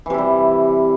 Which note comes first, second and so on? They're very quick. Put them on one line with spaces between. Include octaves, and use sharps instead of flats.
E3 C3 E4 G3